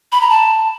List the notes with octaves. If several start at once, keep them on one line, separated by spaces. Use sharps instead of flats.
B5
A#5
A5